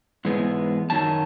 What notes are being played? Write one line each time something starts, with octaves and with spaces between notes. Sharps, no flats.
G#2 E3 G#3 B3
F#2 D#3 F#3 A5